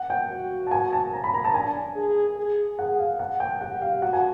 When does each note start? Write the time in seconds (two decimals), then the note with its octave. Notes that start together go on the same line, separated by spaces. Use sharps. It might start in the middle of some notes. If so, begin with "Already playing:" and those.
Already playing: F#5
0.10 G5
0.31 F#4
0.67 A5
0.71 G#5
0.93 A5
1.13 A#5
1.24 B5
1.34 A#5
1.45 A5
1.54 D4 G#5
1.96 G#4
2.38 G#4
2.78 G#4 F#5
2.99 F5
3.19 F#5
3.40 G5
3.61 G4 F#5
3.81 F5
4.02 F#4 F#5
4.13 G#5